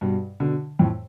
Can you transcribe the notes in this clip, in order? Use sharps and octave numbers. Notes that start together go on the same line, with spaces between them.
G2 B2
B2 D3
F2 A2